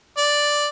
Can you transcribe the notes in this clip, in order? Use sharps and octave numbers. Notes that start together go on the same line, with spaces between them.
D5